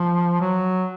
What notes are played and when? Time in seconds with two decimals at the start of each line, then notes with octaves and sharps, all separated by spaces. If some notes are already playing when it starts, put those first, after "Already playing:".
Already playing: F3
0.41 F#3